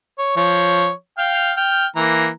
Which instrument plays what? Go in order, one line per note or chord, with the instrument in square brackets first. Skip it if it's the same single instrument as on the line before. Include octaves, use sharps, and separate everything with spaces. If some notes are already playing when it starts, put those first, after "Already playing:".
[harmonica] C#5
F3 C#5
F5 G5 F6
G5 F6
E3 A#3 A#5